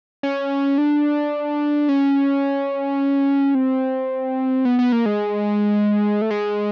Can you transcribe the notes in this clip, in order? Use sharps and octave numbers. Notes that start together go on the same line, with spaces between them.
C#4
D4
C#4
C4
B3
B3
A#3
G#3
A3
G#3